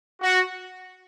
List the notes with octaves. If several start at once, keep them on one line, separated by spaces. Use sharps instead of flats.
F#4